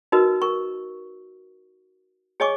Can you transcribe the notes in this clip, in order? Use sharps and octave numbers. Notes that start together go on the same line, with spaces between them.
D#4 F#4 A#4 B4 D#5
A#4 C#6
G#4 C#5 D#5 G#5 C#6 D6